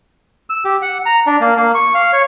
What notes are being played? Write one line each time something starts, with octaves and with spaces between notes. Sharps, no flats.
E6
G4
F#5
A#5
D4
A#3
A#3
C#6
F5
C#5